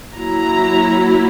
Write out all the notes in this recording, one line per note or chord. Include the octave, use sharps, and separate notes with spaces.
F#3 A#3 E4 A#5